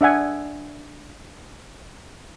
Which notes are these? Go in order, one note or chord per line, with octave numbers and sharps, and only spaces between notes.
D4 E5 F#5 G#5